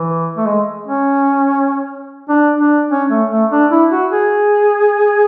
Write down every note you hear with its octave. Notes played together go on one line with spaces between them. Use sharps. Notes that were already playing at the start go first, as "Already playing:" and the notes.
Already playing: E3
A3
G#3
C#4
D4
D4
C#4
A3
A3
D4
E4
F#4
G#4